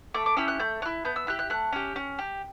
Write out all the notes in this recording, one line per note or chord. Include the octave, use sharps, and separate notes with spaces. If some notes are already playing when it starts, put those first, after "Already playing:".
A3 D6
D6
C#4 E4 G4 E6
F#6
A3 G6
C#4 E4 F#6
B3 G6
E6
E4 G4 F#6
F#6
A3 F#6
C#4 G4
C#4
G4